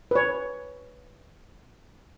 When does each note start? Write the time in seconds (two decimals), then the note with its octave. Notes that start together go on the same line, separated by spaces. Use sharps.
0.11 B4 C#5